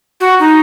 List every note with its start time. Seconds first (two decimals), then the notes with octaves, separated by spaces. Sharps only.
0.20 F#4
0.40 D#4